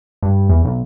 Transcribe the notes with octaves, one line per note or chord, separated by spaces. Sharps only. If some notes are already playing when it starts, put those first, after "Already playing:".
G2
E2
B1